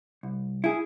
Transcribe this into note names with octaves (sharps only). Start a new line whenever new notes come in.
C2
E4 G#4